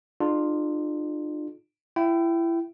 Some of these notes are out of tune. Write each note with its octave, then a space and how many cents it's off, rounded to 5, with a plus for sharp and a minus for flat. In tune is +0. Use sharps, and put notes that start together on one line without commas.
D4 +45 F4 +0 G#4 +30
E4 +25 G5 -20